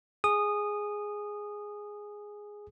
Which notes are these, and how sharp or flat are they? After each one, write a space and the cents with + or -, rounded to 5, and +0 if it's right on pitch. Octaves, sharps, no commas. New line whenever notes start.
G#4 +0 D#6 -15